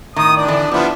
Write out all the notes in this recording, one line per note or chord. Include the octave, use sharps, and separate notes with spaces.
A2 D#3 D#6
D4 D5
D3 E3
F3 G3 B3 D4 E4